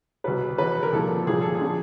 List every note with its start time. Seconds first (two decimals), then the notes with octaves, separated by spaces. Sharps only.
0.24 C2 B2 B4
0.58 F1 E2 B2 B4
0.83 A#4
0.92 C2 A#2 F3 A4
1.27 C2 A#2 F3 G#4
1.41 A4
1.55 G#4
1.61 D3 F3